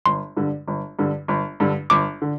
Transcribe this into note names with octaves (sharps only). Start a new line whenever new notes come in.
G1 C6
G2 D3
G1
G2 D3
G1
G2 D3
G1 D6
D3